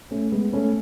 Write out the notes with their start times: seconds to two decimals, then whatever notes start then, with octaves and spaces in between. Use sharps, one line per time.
0.11 A3 C#4
0.32 G#3 B3
0.53 A3 C#4